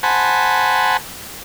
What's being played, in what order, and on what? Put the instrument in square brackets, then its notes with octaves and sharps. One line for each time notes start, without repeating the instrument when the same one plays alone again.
[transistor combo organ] C5 F#5 G#5 A5 B5